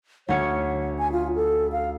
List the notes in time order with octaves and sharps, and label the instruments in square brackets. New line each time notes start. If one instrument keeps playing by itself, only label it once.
[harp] D2 C#4 C#7 [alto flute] C#5
[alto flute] G#5
F4
A4
F5